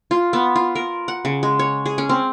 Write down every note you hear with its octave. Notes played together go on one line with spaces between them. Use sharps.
F4
B3
F4
A#4
F#5
C#3
G#3
C#5
G#4
C#4
C4